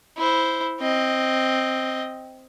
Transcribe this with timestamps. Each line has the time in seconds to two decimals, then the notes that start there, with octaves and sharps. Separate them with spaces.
0.18 E4 C5
0.80 C4 D#5